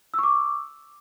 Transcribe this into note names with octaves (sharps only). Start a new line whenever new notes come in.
C#6 D6 E6